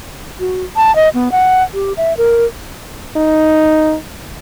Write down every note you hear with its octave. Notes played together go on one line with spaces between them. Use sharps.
F#4
A5
D#5
B3
F#5
G4
E5
A#4
D#4